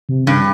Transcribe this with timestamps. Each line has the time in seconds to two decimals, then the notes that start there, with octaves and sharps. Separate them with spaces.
0.09 C3
0.26 G2 C#3